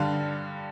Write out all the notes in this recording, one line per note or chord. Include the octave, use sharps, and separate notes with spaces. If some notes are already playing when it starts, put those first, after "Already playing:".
Already playing: G2 D3 G3 F5